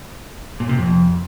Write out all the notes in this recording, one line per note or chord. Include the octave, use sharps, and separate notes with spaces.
A#2
C3
F2